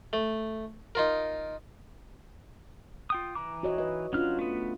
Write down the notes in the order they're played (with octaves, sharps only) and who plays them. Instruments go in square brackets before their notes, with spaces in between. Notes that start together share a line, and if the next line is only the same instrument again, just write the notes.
[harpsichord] A3
D#4 F4 A#4
[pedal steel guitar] F4 G5 D#6
E3 A#5 D6
[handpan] F#4 C#5 D#5
B4 D#5
[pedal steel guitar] F#3 F6 [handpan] C#4 D4 F4
[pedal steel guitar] A3 B3